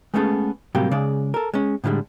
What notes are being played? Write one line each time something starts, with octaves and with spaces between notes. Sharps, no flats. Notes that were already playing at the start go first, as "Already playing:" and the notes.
G#3 A3 B3 C#4 G#4 A4
A2 C3 F#3 G3 A#3 G4
C#3 G#3 D5
A4 A#4
G#3 C#4
A2 D3 F3 G3 G#3